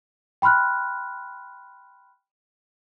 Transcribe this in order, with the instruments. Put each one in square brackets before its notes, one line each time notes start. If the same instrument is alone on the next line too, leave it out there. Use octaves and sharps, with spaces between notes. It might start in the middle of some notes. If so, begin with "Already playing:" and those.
[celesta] G5 B5 C6 F6 F#6